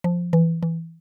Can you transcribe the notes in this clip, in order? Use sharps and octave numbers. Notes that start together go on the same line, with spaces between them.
F3
E3
E3